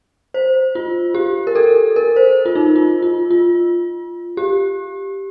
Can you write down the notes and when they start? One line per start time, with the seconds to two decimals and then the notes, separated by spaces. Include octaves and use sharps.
0.34 C5
0.75 F4
1.14 G4
1.47 A#4
1.55 A4
1.96 A#4
2.16 C5
2.46 F4
2.55 D#4
2.76 F4
3.02 F4
3.31 F4
4.37 G4